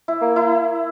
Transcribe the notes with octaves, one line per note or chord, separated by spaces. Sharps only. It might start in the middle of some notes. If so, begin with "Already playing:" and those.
E4
A#3
E4